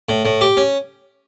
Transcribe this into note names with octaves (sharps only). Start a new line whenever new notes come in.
A2
A2
G4
C#4